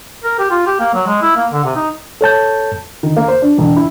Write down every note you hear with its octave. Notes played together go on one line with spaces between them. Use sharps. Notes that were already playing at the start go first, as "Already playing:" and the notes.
A#4
G4
F4
G4
A#3
F#3
G#3
E4
A#3
D3
C3
D#4
A4 C#5 A5 G6
D#3
A#3
C5
D4
E1
E4